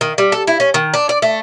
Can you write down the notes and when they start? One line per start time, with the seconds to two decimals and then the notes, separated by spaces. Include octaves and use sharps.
0.01 D#3
0.18 G3
0.32 A4
0.47 E4
0.60 C#4
0.74 D#3
0.94 D4
1.09 D5
1.22 A3